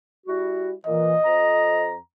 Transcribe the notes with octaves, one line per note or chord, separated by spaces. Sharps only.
G3 E4 F#4
A#2 E3 D#5
F2 A#5